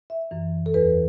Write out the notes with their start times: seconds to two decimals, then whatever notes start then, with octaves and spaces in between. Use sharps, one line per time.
0.10 E5
0.31 F#2 E3
0.66 A4
0.74 E2 E3 B4